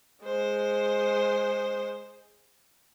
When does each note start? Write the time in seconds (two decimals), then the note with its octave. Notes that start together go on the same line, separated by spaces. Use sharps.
0.23 G#3 C5